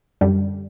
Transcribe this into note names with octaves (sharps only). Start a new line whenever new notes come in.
F#2 D3 G3